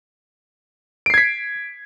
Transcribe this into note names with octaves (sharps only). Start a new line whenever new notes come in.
G#6 B6 C7 D7